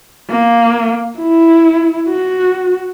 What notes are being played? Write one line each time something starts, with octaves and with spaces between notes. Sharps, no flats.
A#3
E4
F#4